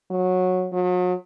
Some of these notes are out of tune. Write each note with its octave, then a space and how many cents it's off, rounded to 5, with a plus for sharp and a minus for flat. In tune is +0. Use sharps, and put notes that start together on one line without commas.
F#3 -15
F#3 -40